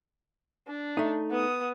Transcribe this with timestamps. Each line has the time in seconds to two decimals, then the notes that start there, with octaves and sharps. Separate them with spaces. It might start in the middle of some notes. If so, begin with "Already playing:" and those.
0.68 D4
0.97 A3 D#4
1.31 B3 D#6